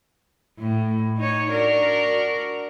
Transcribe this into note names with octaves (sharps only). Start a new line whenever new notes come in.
A2
D#4 C#5
D4 F#4 A#4